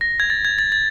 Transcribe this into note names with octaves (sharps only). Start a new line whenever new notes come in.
A#6
G#6
A6
G#6
A6
A6